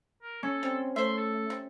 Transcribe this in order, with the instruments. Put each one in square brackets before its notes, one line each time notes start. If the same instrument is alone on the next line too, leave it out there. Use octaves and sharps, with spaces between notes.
[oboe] A#4
[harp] C#4 [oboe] A4
[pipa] G3 [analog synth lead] C4
[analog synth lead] A3 [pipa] C5 E5 [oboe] C6
[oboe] A4
[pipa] C3